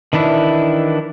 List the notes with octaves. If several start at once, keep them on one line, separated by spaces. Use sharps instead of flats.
D#3 E3 D4 E4